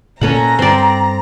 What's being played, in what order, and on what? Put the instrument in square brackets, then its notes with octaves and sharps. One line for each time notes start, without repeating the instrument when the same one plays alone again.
[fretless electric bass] A#2 A#3 [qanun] C#4 A4 F#5 [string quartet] A#5
[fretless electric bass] G2 [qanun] C4 D5